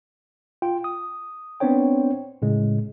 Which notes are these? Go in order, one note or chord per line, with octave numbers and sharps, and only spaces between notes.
F4 G5
D#6
B3 C4 D4 C5 C#5 G5
A2 C#3 G#3